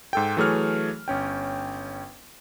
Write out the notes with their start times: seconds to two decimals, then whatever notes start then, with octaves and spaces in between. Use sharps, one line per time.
0.13 G#2 A4 G5
0.37 E3 F#3 A3 G#4 C#5 F6
1.08 G1 C#4 G5